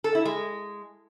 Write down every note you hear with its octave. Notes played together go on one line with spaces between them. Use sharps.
A4
E4
G#3